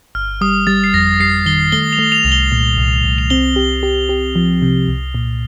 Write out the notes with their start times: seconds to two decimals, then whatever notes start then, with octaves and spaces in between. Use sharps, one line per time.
0.15 G1 F6
0.41 G3 D#6
0.67 G3 A6
0.84 C7
0.94 F2 A#6
1.20 G3 C7
1.46 D#3 G7
1.72 A3 G7
1.93 F7
1.99 A3
2.12 F7
2.25 C2
2.32 G7
2.52 A#2
2.77 C2
3.04 C2
3.18 F7
3.30 C4 G7
3.56 G4
3.83 G4
4.09 G4
4.36 F3
4.62 C3
4.88 C2
5.15 A#2